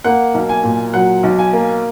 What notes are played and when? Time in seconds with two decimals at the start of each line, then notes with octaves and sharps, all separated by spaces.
0.04 A#3 F#5
0.34 B1
0.49 G#5
0.63 A#2
0.94 F#3 F#5
1.23 B1
1.39 G#5
1.53 A#3